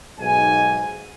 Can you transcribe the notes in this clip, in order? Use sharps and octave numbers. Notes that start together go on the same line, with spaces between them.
B1 G#2 G#5